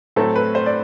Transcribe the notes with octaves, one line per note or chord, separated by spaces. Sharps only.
A2 F#3 A3 C4 A4
B4
C5
D5